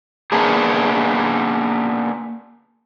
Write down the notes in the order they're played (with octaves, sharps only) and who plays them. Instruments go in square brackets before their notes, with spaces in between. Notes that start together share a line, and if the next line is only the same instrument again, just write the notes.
[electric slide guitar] A#3 B3 D4 G#4